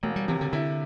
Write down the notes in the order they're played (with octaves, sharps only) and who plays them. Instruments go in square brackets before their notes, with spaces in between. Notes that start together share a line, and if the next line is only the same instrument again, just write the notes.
[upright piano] E1 [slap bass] A3
[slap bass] G3
[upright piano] C3 [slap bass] E3
[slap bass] D3
[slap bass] D3 [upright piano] E4